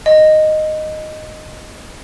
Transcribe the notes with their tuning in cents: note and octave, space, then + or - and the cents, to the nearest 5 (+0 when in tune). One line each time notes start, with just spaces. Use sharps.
D#5 -5